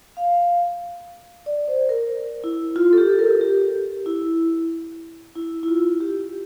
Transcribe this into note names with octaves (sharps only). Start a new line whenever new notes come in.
F5
D5
C5
A#4
E4
F4
A4
G4
A#4
G4
E4
E4
E4
F4
G4